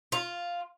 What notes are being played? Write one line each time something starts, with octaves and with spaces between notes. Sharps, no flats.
F4